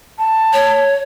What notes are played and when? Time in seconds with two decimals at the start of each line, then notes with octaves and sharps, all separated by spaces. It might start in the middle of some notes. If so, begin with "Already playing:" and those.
0.19 A5
0.53 C#5